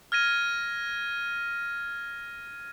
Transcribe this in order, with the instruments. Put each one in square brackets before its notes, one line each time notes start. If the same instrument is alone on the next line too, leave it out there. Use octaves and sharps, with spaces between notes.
[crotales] F6 G#6 A#6 D#7